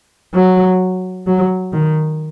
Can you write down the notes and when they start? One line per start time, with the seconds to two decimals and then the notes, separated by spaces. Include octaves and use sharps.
0.34 F#3
1.27 F#3
1.73 D#3